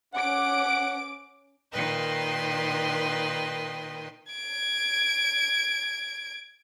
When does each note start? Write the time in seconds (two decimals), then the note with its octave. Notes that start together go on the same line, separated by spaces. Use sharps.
0.14 C#4 F#5 D6 D7
1.71 A#2 D#3 B4 D#5 G5 C6
4.32 G#6 D7